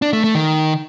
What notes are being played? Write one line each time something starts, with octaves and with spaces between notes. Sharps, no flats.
D4
A3
A3
D#3